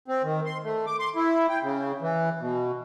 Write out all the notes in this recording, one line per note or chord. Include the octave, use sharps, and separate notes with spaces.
C4
D#3
C6
A3
D6
C6
E4
G5
C#3
E3
B2